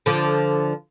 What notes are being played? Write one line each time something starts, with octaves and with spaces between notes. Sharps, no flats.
D3 F3